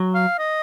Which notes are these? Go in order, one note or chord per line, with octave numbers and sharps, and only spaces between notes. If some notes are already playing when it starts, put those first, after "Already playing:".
Already playing: F#3
F5
D#5